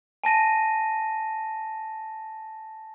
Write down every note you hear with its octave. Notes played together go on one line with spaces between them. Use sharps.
G#5 A5 A#6 D#7